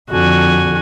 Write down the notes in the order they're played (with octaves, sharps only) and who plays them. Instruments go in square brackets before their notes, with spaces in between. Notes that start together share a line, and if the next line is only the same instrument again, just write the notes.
[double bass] F2 D3 [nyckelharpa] F#4 G#5